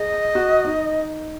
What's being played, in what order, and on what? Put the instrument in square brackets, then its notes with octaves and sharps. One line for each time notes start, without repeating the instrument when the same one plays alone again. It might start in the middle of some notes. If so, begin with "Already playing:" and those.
Already playing: [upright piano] G#4 [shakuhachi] D#5
[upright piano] F#4
D#4